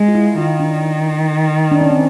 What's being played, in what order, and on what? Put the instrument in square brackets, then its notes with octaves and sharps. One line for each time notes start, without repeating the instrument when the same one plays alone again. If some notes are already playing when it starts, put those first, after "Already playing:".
Already playing: [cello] G#3
[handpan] F4
E4
[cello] D#3 [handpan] F4
[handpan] D4
D4
C#4
C4